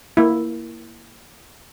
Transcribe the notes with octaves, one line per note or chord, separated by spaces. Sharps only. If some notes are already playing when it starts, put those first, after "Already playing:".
A#3 E4